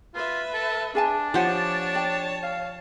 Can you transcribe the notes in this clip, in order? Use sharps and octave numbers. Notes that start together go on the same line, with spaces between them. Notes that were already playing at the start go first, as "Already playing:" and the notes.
F4 B4 E5
A4
D4 G#4 G#5 A5
F3 G4 C5 C#5 F#5 G#5 A5
D5 G5
F5